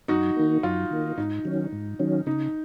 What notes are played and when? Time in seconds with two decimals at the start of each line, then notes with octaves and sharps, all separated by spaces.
0.08 F#2 D#4 F#4
0.36 D#3 A#3
0.63 F#2 F4
0.91 D#3 A#3
1.17 G#2 D#4
1.45 D#3 F#3 C#4
1.72 G#2
1.99 D#3 F#3 C#4
2.26 C#3 D#4